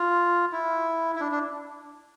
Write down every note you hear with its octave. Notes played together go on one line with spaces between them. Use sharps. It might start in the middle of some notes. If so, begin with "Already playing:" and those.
Already playing: F4
E4
E4
D4
D4